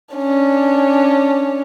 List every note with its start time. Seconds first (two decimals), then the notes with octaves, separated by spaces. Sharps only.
0.15 C#4 D4